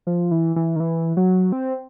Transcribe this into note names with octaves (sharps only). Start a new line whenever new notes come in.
F3
E3
E3
D#3
E3
F#3
C4